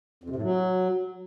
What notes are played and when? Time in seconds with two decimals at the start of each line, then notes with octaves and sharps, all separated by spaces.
0.24 F2
0.30 C3
0.36 A2
0.42 F#3